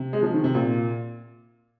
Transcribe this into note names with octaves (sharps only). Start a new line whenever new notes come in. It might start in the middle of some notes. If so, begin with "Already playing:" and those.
Already playing: C3
G#3
F3
D#3
C3
A#2